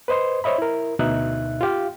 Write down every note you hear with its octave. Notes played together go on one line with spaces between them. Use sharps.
B4 C5 D#5 C6
C5 C#5 D#5 E5 B5
E4 A#4
D2 B2 D#4 E5 F#6
F4 G4 F5